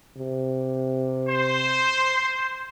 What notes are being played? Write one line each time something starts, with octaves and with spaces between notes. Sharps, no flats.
C3
C5